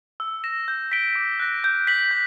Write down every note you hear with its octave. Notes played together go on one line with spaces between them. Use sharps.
E6
A#6 E7
G6
B6 D7 G7
D6
F#6 A#6
G6
B6 D7 F#7
G6